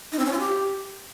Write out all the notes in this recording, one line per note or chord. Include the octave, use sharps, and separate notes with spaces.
D#4
C4
C#4
F4
G4